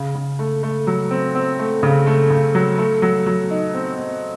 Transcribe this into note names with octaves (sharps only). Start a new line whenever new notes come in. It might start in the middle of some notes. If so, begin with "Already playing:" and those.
Already playing: C#3
C#3
A3
A3
F#3
C4
C4
A3
C#3
A3
C#3
F#3
A3
F#3
F#3
D#4
C4
C4